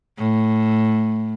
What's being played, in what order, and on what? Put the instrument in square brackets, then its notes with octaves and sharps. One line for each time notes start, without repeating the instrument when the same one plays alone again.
[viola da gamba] A2